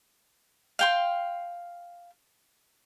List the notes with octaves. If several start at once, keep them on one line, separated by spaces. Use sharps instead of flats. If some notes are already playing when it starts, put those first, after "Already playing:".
F5 G5 C6